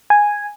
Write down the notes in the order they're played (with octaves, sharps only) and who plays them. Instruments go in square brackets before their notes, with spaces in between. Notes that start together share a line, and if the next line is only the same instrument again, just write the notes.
[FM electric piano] G#5